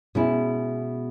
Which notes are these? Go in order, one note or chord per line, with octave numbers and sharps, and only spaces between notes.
B2 G#3 C#4 E4